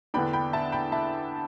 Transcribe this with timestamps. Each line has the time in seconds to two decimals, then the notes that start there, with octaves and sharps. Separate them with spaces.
0.14 E2 D3 B3 D4 G5 B5
0.33 G5 B5
0.53 E5 A5
0.72 G5 B5
0.92 E5 A5